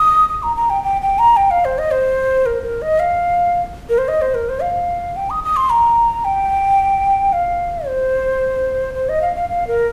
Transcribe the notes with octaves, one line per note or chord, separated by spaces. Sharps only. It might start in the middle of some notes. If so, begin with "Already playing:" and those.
Already playing: D#6
D#6
A#5
A#5
G5
G5
G5
A#5
G5
F5
C5
D#5
C5
A#4
A#4
D#5
F5
A#4
C5
D#5
C5
A#4
C5
F5
G5
D#6
D#6
C6
A#5
G5
F5
C5
C5
D#5
F5
F5
F5
A#4